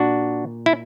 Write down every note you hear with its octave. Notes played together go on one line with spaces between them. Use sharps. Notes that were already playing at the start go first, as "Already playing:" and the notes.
Already playing: A#2 D4 F#4
E4